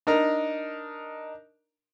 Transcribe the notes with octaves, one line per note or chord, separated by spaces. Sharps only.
D4 D#4 A#4 A#5